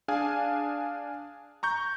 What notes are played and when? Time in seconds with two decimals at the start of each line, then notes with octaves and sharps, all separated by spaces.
0.08 D4 G#4 F5 G#5
1.63 A#5 C#6 G6